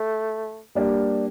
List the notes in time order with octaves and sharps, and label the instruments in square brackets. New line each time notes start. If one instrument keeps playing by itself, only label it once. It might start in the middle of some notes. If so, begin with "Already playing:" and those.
Already playing: [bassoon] A3
[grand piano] G3 A#3 D4 G4